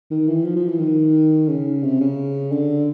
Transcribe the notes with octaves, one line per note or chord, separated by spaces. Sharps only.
D#3
E3
F3
F3
E3
D#3
C#3
C3
C#3
D3